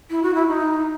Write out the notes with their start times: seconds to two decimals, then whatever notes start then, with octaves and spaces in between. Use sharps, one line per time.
0.10 E4
0.23 F#4
0.34 E4
0.49 D#4